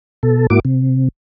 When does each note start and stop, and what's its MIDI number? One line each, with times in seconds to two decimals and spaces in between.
0.23 0.47 47
0.23 0.47 69
0.50 0.60 44
0.50 0.60 58
0.50 0.60 64
0.50 0.60 66
0.50 0.60 86
0.65 1.08 48